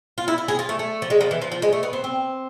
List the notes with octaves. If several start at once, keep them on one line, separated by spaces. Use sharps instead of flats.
F4
E4
E4
G#4
F4
A3
A3
F3
G#3
F3
E3
F3
F3
G#3
A3
B3
C4
C4